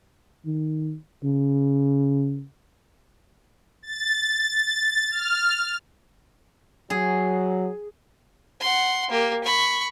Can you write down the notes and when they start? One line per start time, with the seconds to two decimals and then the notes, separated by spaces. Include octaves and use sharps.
0.46 D#3
1.24 C#3
3.83 A6
5.12 F6
6.90 F#3 G#4
8.60 F#5 C6
9.10 A#3 G4
9.44 B5 C#6